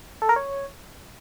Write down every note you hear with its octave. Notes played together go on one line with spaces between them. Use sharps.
A4
A#4
C#5